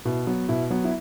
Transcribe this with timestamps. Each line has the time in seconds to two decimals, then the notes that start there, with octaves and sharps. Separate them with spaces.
0.05 B2 E4
0.27 F#3 B3
0.49 B2 E4
0.70 F#3 B3
0.84 E4